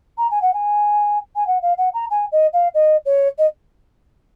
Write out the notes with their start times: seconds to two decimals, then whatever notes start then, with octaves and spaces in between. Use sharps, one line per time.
0.18 A#5
0.31 G#5
0.42 F#5
0.54 G#5
1.36 G#5
1.47 F#5
1.62 F5
1.77 F#5
1.94 A#5
2.10 G#5
2.32 D#5
2.53 F5
2.74 D#5
3.05 C#5
3.38 D#5